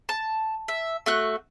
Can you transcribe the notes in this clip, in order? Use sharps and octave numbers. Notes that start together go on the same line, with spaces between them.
A5
E5
A3 F#4 F#6